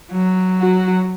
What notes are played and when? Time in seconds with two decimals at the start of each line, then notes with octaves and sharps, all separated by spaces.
0.11 F#3
0.61 F#4